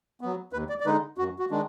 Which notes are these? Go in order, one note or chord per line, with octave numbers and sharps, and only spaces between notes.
F#3 B3
D#2 B4
D5
D5
D3 G#3 D#4 B4
F#2 F#4
F#4
D#3 G#3 D4